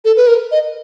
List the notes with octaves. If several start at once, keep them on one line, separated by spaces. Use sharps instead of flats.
A4
B4
A#4
D#5